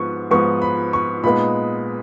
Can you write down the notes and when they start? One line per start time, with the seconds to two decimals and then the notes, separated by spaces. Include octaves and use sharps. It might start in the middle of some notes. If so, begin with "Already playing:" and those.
Already playing: G#2 F3 B3 C#6
0.31 G#2 F3 B3 C#6
0.62 B5
0.93 C#6
1.24 A#2 G#3 B3 D#4 B5